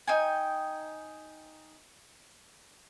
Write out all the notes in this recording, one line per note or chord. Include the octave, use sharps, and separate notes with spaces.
D#4 G5 G#5